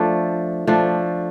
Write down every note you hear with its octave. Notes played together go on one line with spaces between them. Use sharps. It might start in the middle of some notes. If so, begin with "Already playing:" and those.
Already playing: F3 A3 D4
F3 A3 D4